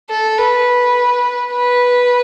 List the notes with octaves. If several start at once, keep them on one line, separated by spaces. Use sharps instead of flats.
A4
B4
B4